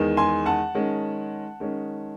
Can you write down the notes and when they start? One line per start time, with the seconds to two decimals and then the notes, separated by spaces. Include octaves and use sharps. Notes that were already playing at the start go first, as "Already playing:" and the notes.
Already playing: E2 D#3 G#3
0.17 G#5 C6
0.46 F#5 A5
0.74 D#3 G#3 C#4
1.60 D#3 G#3 C#4